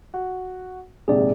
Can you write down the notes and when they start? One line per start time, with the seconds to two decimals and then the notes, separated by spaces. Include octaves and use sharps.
0.14 F#4
1.08 A#1 G#2 C3 G#4 D5